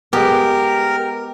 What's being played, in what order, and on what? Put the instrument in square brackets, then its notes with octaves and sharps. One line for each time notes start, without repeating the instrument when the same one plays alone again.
[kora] G#3 B3 [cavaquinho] G4 [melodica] A#4